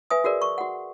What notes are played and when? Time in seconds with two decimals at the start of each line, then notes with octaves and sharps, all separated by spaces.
0.10 B4 E5 G#5 D#6
0.24 F#4 G#4 A#4 D5
0.42 C#6
0.58 F#4 F#5